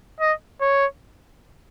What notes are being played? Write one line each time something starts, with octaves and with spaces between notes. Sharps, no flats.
D#5
C#5